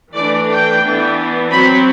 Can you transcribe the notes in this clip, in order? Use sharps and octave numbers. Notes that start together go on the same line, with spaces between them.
E3 A3 D4 D5
G5
E3 B3 D4
F#3 C4 B5